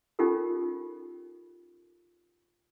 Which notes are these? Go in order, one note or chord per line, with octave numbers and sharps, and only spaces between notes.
C#4 D#4 F4 G4 A4 A#4